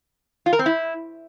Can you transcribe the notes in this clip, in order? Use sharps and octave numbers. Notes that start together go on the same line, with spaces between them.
F4
A#4
C4
E4